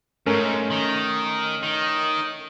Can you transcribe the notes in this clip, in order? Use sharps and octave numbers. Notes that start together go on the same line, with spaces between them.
G#2 A3 C#4 A#4
D#3
D#3